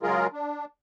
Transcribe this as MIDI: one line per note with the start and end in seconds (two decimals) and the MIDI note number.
0.03 0.27 49
0.03 0.27 54
0.03 0.27 56
0.03 0.27 65
0.03 0.27 68
0.03 0.27 70
0.33 0.65 62